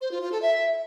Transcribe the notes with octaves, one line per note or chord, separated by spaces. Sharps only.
C5
F4
F4
A4
E5